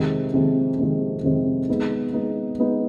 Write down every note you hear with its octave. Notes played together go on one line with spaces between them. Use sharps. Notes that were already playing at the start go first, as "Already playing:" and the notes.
Already playing: F2 C3 D#3 G#3 C4
F2 C3 D#3 G#3 C4
F2 C3 D#3 G#3 C4
F2 C3 D#3 G#3 C4
G#3 B3 D#4
G#3 B3 D#4
G#3 B3 D#4